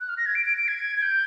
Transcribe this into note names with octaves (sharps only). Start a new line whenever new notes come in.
F#6
F6
A#6
G#6
D7
D7
D7
G#6
G#6
G6